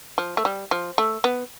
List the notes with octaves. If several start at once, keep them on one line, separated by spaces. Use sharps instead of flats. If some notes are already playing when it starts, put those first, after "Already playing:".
F3
A3
G3
F3
A3
B3